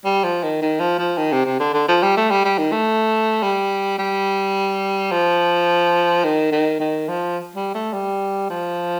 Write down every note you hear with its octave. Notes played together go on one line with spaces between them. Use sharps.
G3
F3
D#3
D#3
F3
F3
D#3
C3
C3
D3
D3
F3
G3
A3
G3
G3
D#3
A3
G3
G3
F3
D#3
D#3
D#3
F3
G3
A3
G3
F3